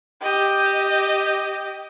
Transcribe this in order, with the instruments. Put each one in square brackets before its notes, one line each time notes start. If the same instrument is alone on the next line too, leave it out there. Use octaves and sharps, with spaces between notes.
[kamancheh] G4 D#5